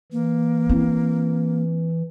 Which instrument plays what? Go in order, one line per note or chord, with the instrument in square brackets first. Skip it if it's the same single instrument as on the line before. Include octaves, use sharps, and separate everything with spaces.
[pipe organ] E3 [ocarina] A#3
[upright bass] C4 E4